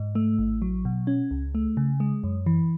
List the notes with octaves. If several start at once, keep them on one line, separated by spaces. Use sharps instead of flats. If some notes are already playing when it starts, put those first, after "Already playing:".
Already playing: G#2
A3
A1
F#3
B2
C#4
C#2
A3
C#3
G#3
F#2
E3